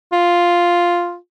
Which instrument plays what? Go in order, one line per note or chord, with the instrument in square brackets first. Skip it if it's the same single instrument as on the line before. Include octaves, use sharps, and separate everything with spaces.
[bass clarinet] F4